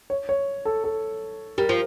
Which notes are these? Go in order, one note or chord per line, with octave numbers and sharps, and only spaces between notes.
C#5
C#5
A4
A4
G3 A#4
F3